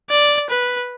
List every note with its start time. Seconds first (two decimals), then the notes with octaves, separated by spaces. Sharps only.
0.10 D5
0.50 B4